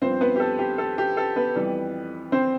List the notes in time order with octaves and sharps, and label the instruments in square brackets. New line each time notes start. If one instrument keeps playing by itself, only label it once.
[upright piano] G2 F3 B3 C4 C5
B3 B4
G4
A4
G4
A4
G4
A4
B3 B4
F2 E3 G3
C4 C5